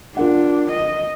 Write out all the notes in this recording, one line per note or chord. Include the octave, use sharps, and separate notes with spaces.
D4 F4 A#4 F#5
D#5